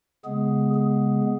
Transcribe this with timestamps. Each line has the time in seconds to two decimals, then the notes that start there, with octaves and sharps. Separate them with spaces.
0.24 C#3 G#3 B3 G#4
0.74 G#4